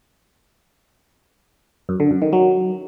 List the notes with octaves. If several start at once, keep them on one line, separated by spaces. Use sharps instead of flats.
F#2
D3
F#2
D#3
F#3